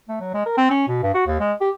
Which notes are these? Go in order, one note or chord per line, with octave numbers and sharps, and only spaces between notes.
A3
F#3
G#3
A#4
C4
C#4
B2
G2
F#4
D#2
G#3
G4